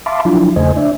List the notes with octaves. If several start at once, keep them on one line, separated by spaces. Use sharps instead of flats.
E5 F5 A5 B5 C6 D6
F3 F#3 D4 E4 F4
E2 C#3 A3 C5 D#5 G#5
D4 D5 E5